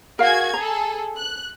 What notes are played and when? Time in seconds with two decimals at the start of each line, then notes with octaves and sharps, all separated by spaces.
0.19 F#4 G#4 A#4 F5 G#6
0.53 G#4 A4 A#5
1.16 F#6